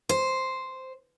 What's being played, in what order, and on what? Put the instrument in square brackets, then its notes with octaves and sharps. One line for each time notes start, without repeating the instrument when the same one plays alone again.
[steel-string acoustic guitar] C5